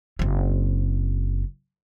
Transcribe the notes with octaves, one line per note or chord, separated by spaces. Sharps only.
F#1 C4